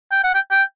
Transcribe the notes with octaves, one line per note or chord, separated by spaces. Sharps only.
G5
F#5
G5
G5